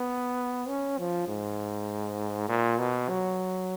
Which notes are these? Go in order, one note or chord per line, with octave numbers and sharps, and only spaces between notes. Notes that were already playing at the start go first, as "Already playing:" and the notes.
Already playing: B3
C#4
F3
G#2
A#2
B2
F#3